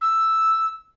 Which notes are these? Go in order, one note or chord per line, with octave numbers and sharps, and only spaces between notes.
E6